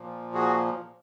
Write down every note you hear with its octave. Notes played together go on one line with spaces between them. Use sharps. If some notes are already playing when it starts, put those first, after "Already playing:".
Already playing: A#2 F3
F#4 G#4